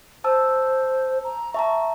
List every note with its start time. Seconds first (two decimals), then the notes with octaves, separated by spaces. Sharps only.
0.24 C5 A5 E6
1.24 A#5
1.54 E5 A5 A#5 C#6